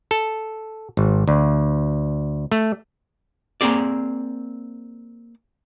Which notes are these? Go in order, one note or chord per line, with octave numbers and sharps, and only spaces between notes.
A4
G#1
D2
A3
A#3 C4 G#4 D5